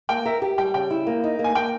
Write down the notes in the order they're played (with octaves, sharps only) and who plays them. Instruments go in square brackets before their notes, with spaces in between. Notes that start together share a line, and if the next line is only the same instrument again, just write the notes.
[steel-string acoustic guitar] A#3 [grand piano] G5
[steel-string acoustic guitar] A#4 [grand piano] E5
[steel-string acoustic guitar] G4
[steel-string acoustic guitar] G3 [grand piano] G5
[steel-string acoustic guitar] C#3 [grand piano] G5
[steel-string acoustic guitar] E4
A#3
D#4
A#3
[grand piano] G#5
[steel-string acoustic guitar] A#3 [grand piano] G5